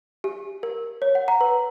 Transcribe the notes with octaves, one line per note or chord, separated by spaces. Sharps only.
G4
A#4
C#5
F#5
F#5 A#5
B4